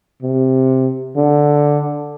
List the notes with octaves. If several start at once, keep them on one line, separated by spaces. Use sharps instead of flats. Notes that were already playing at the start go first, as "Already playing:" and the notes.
C3
D3